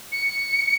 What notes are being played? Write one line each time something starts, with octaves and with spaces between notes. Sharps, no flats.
C#7